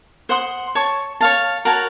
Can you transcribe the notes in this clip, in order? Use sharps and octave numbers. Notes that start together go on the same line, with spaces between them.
C5 F#5 C6 D#6
C#5 A5 C#6
C#5 F5 A5
F#4 A#4 C#5 A5